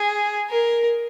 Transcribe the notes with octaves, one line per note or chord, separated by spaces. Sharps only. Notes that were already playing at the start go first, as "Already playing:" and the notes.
Already playing: G#4
A#4